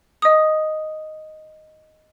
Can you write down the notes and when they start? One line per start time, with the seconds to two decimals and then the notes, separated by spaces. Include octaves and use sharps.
0.22 D#5 D#6